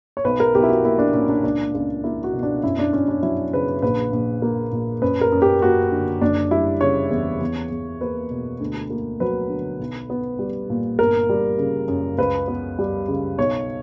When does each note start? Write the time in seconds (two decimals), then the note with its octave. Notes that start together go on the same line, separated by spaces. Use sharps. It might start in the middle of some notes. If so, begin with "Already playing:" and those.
0.17 C#5
0.24 B1 B4
0.40 A#4
0.55 B1 G4
0.63 E4
0.69 F#4
0.84 A#3 E4
0.99 D4
1.14 A#2 C#4
1.29 D4
1.44 C#2 D4
1.74 C#2
2.04 A#3 E4
2.24 F#4
2.33 B2
2.43 D4
2.63 F#2 E4
2.79 D4
2.93 F#2 C#4
3.09 D4
3.23 F#3 E4
3.53 C#3 B4
3.82 A#1 B4
4.12 A#1
4.42 A#3
4.72 A#2
5.02 F#2 B4
5.21 A#4
5.32 F#2
5.42 G4
5.62 A#3 F#4
5.92 D3
6.21 F#1 D4
6.51 G3 E4
6.81 C#3 C#5
7.10 E2
7.41 E2
7.71 E2
8.01 A#3 B4
8.31 B2
8.60 D2
8.90 A#3
9.20 F#3 B4
9.49 D3
9.80 B1
10.10 B3
10.39 G3
10.70 A#2
10.99 G1 A#4
11.29 G3
11.58 C#3
11.88 F#2
12.18 C#2 B4
12.48 B3
12.79 G3
13.08 C#3
13.38 B1 C#5